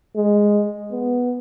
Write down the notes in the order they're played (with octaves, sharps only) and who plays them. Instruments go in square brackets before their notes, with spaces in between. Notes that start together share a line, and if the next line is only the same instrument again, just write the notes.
[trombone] G#3
B3